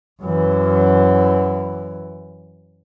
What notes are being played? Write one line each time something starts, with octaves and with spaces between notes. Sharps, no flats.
F#2 E3